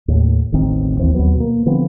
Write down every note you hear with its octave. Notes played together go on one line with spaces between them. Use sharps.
D#2 A2
E1 A1 D#3 C4
D#2 E3 C4
D#2 D#3 F#3 B3
B2 A#3
D3 F3 B3 C4